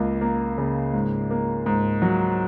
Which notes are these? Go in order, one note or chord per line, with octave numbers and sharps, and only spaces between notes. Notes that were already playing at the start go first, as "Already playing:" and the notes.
Already playing: C#2 A#3
A#3
C#3
G#2
A#3
G#2
F#3